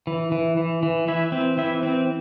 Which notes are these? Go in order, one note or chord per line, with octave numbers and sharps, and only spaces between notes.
E3
E3
E3
E3
E3 E4 E5
C4
E3 E4 E5
C4